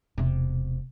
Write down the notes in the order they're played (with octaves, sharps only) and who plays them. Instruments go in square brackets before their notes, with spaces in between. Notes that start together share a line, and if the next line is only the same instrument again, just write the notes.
[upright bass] E1 C3